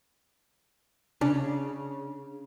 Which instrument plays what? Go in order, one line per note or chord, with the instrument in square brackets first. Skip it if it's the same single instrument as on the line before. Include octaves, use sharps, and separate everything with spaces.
[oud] C#3 [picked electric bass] C#4 D4